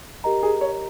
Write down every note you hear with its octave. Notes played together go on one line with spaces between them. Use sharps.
G4 A#4 D#5 A#5
G#4
C#5